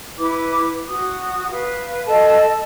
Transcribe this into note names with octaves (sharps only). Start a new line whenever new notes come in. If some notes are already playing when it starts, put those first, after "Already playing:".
E4 B4 D6
F#4 D#6
B4 F5
A4 D#5 A5